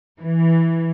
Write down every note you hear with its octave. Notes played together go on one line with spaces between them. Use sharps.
E3